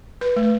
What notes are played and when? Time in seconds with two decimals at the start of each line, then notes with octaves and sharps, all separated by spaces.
0.21 B4
0.36 A3